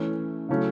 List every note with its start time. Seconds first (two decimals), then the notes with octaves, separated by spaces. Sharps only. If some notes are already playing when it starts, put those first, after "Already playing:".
Already playing: E3 A3 C#4
0.49 C#3 F#3 A3 C#4 E4